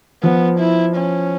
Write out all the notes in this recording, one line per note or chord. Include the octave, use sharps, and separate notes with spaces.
F3 B3
E4
C#4